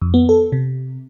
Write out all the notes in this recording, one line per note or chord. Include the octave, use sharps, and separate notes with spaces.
F2
B3
A4
C3